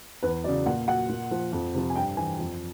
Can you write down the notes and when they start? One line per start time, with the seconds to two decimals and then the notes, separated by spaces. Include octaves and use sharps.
0.23 E2 B4
0.44 F#3 D5
0.48 C#3
0.66 A#2 F#5
0.88 F#3 F#5
1.09 A#2
1.31 F3
1.53 F2
1.75 C3 F3
1.90 G#5
1.96 G2 G5
2.17 E3 G#5
2.39 F2